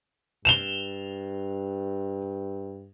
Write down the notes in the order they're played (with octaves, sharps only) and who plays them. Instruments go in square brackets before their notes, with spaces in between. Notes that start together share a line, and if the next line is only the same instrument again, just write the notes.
[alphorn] G2 [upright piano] E7 F7 G7